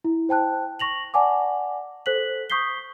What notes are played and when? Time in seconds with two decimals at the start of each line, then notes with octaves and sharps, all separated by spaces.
0.04 E4
0.29 C5 G5 A5 F#6
0.80 C#6 A#6 F7 F#7
1.14 D5 F#5 G#5 A5 D6
2.06 A4 C5 F#6 B6 F#7
2.50 C#6 D#6 G6 B6 C7 G7